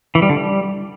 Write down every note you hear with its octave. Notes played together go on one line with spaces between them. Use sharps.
E3
G3
D3
G3